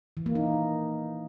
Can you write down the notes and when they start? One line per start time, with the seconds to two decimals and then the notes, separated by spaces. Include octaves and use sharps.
0.17 E3
0.26 A#3
0.35 D#4